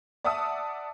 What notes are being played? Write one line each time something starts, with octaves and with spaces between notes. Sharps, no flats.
D5 E5 F#5 A5 D#6 E6